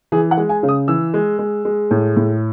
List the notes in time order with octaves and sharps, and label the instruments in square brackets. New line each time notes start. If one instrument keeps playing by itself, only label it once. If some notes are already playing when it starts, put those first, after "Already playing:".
[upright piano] E3 G#4
F#5
G#3
G#5
C#3
D#6
E3 E6
G#3
G#3
G#3
A2
A2